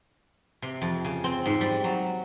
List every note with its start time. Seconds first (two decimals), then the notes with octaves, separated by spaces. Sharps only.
0.62 C3
0.82 F2
1.04 C#3
1.24 C4
1.46 G#2
1.61 G3
1.84 F#3